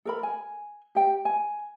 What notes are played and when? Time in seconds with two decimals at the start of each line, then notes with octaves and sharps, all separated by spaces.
0.05 A4 A#4 B5
0.23 G#5
0.95 G4 G5
1.25 G#5